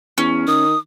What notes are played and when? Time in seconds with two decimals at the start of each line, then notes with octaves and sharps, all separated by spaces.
0.18 E2 C#4
0.47 D#3 D#6